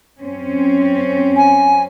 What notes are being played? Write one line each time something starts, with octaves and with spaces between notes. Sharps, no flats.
F#2 C4 C#4
G#5